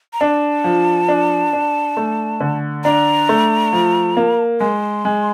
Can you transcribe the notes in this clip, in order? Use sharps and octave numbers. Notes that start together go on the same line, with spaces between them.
A#5
D4 A5
F3
D4
D4
A3
D3
D4 A#5
A3
F3
A#3
G#3 C6
G#3